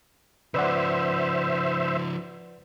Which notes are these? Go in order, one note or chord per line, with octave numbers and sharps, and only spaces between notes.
C#3 F3 B4 C5 D5 E5 F#5